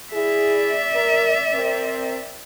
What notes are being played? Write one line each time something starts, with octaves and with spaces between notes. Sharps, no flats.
E4 G#4 D5 E5
A#4
C4 A#4